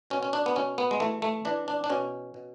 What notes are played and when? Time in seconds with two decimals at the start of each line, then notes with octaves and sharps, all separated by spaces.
0.10 B2 C#4
0.23 C#4
0.33 D4
0.46 B3
0.56 B2 C#4
0.78 B3
0.91 G#3
1.00 E3 A3
1.22 A3
1.45 E3 D4
1.68 D4
1.84 D4
1.90 B2 C#4
2.34 B2